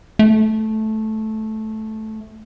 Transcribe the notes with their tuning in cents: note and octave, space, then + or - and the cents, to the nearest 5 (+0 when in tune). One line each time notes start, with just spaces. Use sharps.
A3 -10